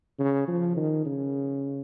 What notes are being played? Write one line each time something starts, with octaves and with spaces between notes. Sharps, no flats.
C#3
F3
D#3
C#3